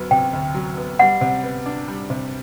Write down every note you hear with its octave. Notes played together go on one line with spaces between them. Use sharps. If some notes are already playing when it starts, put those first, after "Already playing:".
Already playing: D2 F#3 B3
C3 G5
D2
F#3
B3
G3 F#5
C3
B3
D4
G3
C3